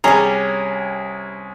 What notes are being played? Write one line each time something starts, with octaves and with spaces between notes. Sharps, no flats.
C2 G3 C#4 G#4 A#5